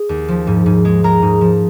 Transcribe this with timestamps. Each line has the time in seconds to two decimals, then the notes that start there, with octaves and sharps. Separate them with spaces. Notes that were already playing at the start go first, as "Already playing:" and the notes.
Already playing: G#4
0.09 D#2
0.28 F3
0.47 G#2
0.66 G#2
0.85 G#3
1.04 G#3 A#4 A#5
1.22 G#2
1.41 F3